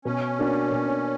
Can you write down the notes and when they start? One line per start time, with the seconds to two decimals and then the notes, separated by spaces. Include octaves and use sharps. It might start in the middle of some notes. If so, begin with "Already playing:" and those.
0.05 B2 C#4
0.39 A#3 D4 F#4
0.72 B2